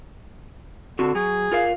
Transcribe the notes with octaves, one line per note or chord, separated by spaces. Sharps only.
D3 C4 F#4
F#3 G#4
F4 A#4 F5